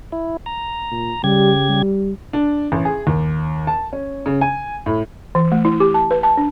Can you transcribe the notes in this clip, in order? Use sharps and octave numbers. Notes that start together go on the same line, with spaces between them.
E4
A#5
A#2
C#3 G3 G4 G#6
G3
D4
A1
G#4
D#2
A5
C#4
C#3
G#5
A2
E3
A3
E4
G4
A5
B4
A5
D4